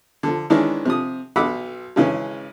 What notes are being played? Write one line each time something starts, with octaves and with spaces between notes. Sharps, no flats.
D3 F3
D#3 E3 G#3 C#4 D4 E4
C3 F3 D#6
B1 D#5 F#5 B5 D6 E6
G#1 C#3 E3 C#4